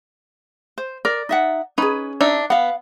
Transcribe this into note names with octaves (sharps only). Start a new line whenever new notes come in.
C5
A#4 D5
D#4 E5 F#5
C#4 D#4 G#4 B4
D4 D#4 E5
B3 F5 F#5